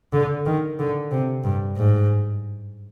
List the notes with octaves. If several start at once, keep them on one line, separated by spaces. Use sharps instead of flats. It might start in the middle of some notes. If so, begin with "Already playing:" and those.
D3
D#3
D3
C3
G2
G#2